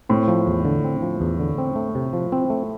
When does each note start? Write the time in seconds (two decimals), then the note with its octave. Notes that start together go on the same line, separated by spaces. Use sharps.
0.09 A2 C4
0.28 F3
0.47 E2
0.65 D3
0.84 C4
1.02 F3
1.21 E2
1.39 D3
1.58 C4
1.76 A3
1.95 C3
2.13 F3
2.32 C4
2.50 A3